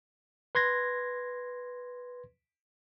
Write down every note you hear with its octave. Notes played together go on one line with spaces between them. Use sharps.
B4 C6 G#6 A#6